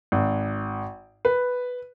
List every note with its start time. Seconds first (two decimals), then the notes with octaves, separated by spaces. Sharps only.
0.12 G#1
1.25 B4